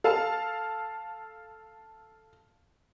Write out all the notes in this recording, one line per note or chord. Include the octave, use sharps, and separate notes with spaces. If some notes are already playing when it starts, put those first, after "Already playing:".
A4 F5 A5